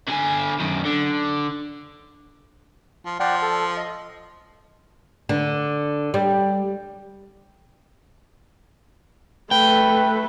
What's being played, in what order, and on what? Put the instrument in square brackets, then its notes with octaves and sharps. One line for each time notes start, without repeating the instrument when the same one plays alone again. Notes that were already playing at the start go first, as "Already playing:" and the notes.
[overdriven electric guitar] D3 G#5
F#2 D#3
D3
[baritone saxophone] F3
[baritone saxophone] F3 [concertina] D5 F#5 G5
[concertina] A4
D#5
[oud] D3
G3
[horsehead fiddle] A3 B4 [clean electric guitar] G5